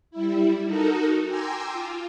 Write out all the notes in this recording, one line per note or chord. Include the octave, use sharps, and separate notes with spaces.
G3 E4
D#4 F#4 A4 A#4
G5 G#5 A#5 C6 D6 E6
F4